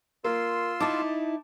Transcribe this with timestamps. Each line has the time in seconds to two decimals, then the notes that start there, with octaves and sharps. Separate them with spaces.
0.24 A#3 F4 C6 E6
0.80 D#4 E4 A5 D6